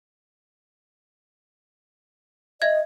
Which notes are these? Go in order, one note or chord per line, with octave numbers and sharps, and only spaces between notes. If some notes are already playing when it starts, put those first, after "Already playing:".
D#5 E5 G#6